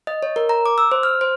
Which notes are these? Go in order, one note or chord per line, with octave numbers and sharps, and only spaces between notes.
D#5
C#5
A#4
A#5
D6
E6
C5
F6
C5